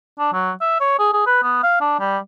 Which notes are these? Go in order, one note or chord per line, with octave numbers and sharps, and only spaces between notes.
D4
F#3
E5
C#5
G#4
G#4
B4
B3
F5
D4
G3